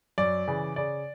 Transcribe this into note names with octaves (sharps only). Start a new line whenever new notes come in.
F#2 D5
C#3 E3
C#3 D5